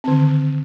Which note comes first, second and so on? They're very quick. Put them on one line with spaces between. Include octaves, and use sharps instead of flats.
C4 D3 D#3